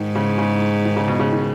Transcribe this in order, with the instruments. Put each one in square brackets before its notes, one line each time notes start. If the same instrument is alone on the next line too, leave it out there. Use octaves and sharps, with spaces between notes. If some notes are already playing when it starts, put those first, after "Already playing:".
Already playing: [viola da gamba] G#2 [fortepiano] D#3
[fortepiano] C#3
C#3
D#3
C#3
B2
C#3
D#3